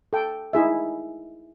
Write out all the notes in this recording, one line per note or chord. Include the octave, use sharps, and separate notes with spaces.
A4 G5
D#4 E4 G#4 E5